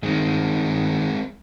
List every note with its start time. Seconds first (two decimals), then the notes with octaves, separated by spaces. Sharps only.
0.03 G2 D#3 G#3 C4